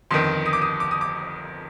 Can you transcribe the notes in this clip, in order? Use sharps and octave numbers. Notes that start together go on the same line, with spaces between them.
G1 F2 D#3 C6
D#6
D6
D#6
D6
D#6
D6